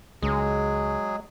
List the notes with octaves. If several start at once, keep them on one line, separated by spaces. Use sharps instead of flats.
C#2 F#3 G#3 G#4